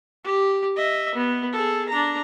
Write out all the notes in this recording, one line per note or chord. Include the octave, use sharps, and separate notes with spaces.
G4
D#5 E5
B3
G#4 A4
D4 A#5